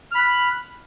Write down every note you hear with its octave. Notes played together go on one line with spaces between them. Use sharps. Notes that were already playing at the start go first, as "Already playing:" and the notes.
B5 F6 F#6